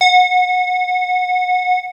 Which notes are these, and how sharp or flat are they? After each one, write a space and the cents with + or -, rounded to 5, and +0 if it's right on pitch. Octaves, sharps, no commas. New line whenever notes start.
F#5 -25